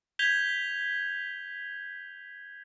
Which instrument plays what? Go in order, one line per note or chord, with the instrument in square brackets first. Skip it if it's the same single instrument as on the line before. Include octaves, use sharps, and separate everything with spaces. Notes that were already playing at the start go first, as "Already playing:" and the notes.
[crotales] G6 G#6 B6 F7 G7